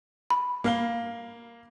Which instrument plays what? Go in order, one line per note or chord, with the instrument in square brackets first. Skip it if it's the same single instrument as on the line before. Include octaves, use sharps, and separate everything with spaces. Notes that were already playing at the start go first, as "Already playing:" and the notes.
[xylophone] B5
[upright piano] A#3 F5 G7